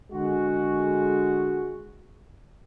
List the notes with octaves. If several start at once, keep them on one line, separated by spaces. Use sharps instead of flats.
D3 G#3 F#4